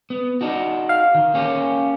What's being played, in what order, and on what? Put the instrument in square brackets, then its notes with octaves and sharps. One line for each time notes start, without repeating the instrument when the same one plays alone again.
[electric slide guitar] B3
D4 D#4 F#4
[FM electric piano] F5
[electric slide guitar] D#3
A#3 C#4 G4